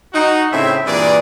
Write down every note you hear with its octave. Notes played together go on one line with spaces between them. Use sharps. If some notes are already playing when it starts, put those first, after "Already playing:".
D#4 F#4
A2 C#3 C4 G#4 E5
G2 A#2 E3 D4 G#4 D5